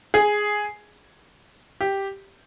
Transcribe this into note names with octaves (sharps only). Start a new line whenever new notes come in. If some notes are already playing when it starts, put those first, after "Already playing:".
G#4
G4